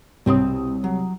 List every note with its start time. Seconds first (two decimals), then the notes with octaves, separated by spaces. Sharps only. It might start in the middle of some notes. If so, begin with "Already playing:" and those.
0.26 C2 B2 C4 C#5 C6 D#6
0.84 F#3